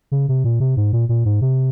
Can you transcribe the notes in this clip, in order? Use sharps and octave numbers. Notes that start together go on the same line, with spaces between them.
C#3
C3
A#2
C3
G#2
A#2
A#2
G#2
C3